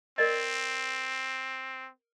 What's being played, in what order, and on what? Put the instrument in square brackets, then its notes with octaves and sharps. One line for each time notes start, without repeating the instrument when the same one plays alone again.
[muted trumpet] C4 [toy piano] A#4 D5 D#5